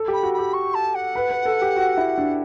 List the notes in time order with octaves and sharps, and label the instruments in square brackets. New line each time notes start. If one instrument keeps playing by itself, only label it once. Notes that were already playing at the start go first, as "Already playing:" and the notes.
Already playing: [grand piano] A4
G4
[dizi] B5
[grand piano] F#4
[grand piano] G4 [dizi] B5
[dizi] C#6
A5
F#5
[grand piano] B4
B4
A4
G4
F#4
E4
D4